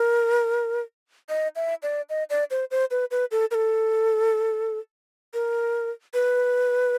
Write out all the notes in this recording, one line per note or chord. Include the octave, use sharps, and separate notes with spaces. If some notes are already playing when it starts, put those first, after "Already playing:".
Already playing: A#4
D#5
E5
D5
D#5
D5
C5
C5
B4
B4
A4
A#4
A4
A#4
B4